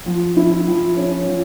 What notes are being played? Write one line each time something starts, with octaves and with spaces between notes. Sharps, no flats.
F3
E4
F3
C#4
F3